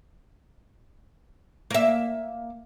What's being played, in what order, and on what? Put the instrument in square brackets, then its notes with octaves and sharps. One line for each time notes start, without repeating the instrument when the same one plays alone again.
[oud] A#3 E5